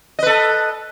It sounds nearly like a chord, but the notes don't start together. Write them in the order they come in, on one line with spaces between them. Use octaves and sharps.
D#5 B4 A4